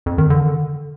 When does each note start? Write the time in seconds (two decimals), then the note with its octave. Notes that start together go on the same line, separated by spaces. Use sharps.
0.06 F2
0.18 D#3
0.30 D3